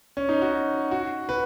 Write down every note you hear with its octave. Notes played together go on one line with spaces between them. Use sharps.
C#4
D#4
F#4
F#4
B4